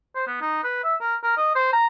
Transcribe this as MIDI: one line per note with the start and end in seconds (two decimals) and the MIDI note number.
0.15 0.26 72
0.27 0.39 59
0.42 0.62 63
0.64 0.82 71
0.84 0.95 76
1.01 1.15 70
1.24 1.33 70
1.37 1.55 75
1.55 1.71 72
1.73 1.87 82